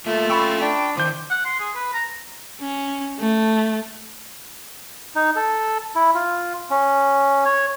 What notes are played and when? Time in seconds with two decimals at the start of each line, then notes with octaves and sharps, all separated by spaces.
0.06 A3 A#3 F4 A#4 E5
0.30 C#4 G5 B5 C#6 E6
0.61 D4 G5
0.97 D#3 E3 C5 D6 G6
1.30 F#5
1.45 C6
1.59 G#4
1.75 B4
1.93 A#5
2.61 C#4
3.19 A3
5.15 D#4
5.36 A4
5.96 E4
6.15 F4
6.70 C#4
7.45 C#5